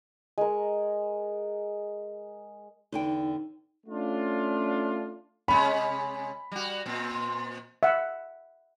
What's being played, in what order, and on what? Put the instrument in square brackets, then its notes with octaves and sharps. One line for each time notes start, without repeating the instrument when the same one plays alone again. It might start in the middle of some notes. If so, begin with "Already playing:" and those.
[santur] G#3 A#4
[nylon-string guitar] E2 D3 G5 [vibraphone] D#4
[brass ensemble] A3 C#4 D4 F4
[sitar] C3 G#3 C#4 [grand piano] B5
[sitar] G3 F#4
A#2 C4
[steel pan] E5 F#5